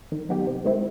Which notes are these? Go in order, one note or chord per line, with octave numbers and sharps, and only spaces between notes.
D#3
F#3 B3 D#4 G4
C3
D#3 G#3 C4 E4